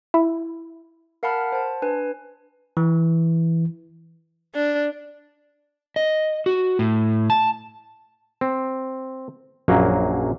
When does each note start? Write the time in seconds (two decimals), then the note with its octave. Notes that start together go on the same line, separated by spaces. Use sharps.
0.14 E4
1.23 A#4 F5 F#5 A5 B5 F6
1.52 C5 A5
1.82 D4 B4 G#5
2.77 E3
4.55 D4
5.96 D#5
6.46 F#4
6.79 A2
7.30 A5
8.41 C4
9.68 A#1 F#2 F#3 A#3